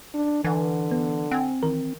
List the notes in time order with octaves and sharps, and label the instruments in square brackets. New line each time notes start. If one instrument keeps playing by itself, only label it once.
[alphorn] D4
[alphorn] D3 [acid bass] E3 [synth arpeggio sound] F#5 G#5
[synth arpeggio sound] B3
[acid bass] C4 [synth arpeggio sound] F#5 G#5
[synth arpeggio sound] D#3 E3 A#4